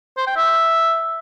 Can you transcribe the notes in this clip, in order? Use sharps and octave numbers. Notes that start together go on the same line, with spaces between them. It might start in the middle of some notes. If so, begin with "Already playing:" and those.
C5
G5
E5